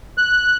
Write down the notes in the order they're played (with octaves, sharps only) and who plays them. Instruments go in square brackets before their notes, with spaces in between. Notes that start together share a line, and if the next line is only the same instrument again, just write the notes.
[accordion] F#6